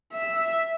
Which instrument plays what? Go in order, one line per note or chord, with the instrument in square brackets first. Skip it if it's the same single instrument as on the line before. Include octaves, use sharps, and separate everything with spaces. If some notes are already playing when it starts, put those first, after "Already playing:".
[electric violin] E5